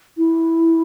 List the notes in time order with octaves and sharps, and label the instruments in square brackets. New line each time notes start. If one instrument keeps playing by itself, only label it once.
[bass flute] E4